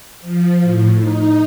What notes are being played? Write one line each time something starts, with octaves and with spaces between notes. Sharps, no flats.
F3
A2
D#4